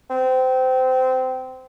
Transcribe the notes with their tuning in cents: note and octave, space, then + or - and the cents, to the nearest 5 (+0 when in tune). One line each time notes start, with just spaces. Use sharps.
C4 -20